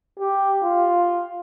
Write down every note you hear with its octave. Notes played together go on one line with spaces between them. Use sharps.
G4
F4